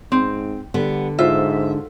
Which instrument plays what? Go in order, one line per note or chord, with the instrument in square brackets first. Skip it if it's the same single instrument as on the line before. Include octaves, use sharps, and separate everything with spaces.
[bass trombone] G#2 [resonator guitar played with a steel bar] C4
[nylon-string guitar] D3 [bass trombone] G3 [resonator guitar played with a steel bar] B3
[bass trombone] G#2 [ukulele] F4 F#4 C5 [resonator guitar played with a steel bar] E5